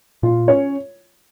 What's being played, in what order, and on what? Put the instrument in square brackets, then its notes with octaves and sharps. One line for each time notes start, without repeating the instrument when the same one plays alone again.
[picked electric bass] A#2 [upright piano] F4
[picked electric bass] C#4 [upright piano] C#5